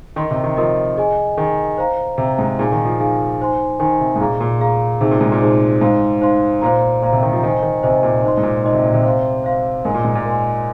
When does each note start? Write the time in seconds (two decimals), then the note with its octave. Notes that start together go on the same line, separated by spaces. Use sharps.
0.16 D#3 A#4 D#5 C6
0.31 C3
0.44 D#3
0.57 F3 A#4 D#5 C6
0.97 G#4 D#5 G#5
1.37 D#3 G#4 D#5 G#5
1.78 C5 F5 A#5
2.18 C3 C5 F5 A#5
2.39 G#2
2.59 A#2 D#4 G#4 F5 G#5
2.72 D#3
2.85 F3
2.99 D#4 G#4 F5 G#5
3.39 D#4 C5 G#5 C6
3.80 D#3 D#4 C5 G#5 C6
4.01 C3
4.16 G#2
4.20 A#2 G#4 F5 A#5
4.40 A#2
4.60 G#4 F5 A#5
5.01 C3 D#4 G#4 C5
5.11 A#2
5.21 G#2
5.32 A#2
5.41 D#4 G#4 C5
5.81 G#2 D#4 C5 F5 C6
6.21 D#4 C5 F5 C6
6.62 A#2 C5 F5 A#5
7.02 A#2 C5 F5 A#5
7.13 C3
7.23 D#3
7.33 F3
7.43 D#3 C5 D#5 G#5
7.62 D#3
7.83 C3 C5 D#5 G#5
8.03 A#2
8.23 A#2 D#4 C5 D#5 C6
8.37 G#2
8.43 A#2
8.64 A#2 D#4 C5 D#5 C6
8.74 C3
8.84 A#2
8.94 C3
9.04 C5 F5 C6
9.44 C5 F5 C6
9.84 G#2 A#4 D#5 G#5 C6
9.94 A#2
10.05 G#2
10.15 A#2
10.25 A#4 D#5 G#5 C6